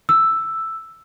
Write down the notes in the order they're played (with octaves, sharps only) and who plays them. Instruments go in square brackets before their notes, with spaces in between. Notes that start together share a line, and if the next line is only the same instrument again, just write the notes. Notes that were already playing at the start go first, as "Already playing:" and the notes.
[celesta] E6